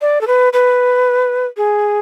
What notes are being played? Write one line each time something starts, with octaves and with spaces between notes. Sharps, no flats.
D5
A4
B4
B4
G#4